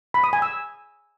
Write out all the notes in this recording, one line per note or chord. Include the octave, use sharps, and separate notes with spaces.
B5
D#6
G#5
E6